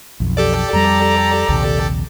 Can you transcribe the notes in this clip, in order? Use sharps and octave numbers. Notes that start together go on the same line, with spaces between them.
B1 F2
G4 A4 D5
F2 G3 A#5
A#1 D#2 C3